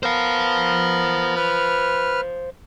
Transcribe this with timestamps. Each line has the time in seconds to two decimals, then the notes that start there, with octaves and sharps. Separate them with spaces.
0.03 B3 A#4 C5 F5
1.36 B4 F6